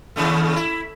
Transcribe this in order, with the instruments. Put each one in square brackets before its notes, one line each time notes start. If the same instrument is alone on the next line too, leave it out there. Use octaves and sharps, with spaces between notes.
[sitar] D#2 C#3 A3
E4